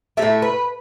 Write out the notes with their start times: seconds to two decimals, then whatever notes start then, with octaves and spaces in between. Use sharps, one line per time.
0.17 F#3 A3 E5
0.22 A2
0.42 B4